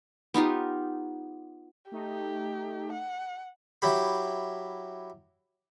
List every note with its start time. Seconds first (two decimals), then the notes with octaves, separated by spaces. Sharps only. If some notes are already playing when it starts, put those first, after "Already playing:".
0.34 B3 D#4 F4 G4
1.92 A3 D#4 G4
2.93 F#5
3.82 F#3 E4 G4 B5